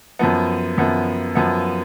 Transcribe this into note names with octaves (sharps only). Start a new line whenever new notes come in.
F#2 F3 B3
F#2 F3 B3
F#2 F3 B3